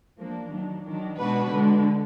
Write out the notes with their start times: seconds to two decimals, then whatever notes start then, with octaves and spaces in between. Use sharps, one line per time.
0.17 F3 A#3 D4
0.50 D#3 F#3 D4
0.84 D#3 F#3 D4
1.17 B2 G#3 D4 F#4 B4
1.51 D3 G#3 D4